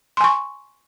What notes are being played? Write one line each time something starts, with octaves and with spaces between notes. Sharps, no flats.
G#5 C6 C#6